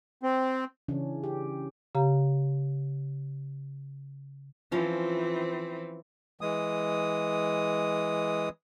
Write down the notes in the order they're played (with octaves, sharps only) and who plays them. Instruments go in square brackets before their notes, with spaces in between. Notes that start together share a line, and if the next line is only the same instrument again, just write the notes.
[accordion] C4
[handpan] C#3 E3 C#4 D4
G4
[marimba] C#3 G4 F5 A#5
[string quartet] E3 C4 [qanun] F3 C#4
[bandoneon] E3 G#3 D#6